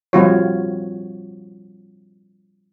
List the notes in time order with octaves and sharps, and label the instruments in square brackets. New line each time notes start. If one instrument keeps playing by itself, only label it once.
[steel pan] F3 G3 C4 F4 F#4 C#5